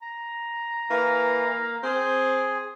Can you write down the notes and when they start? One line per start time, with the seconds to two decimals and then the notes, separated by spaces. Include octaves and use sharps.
0.02 A#5
0.90 E3 A#3 F5
1.83 C4 G#4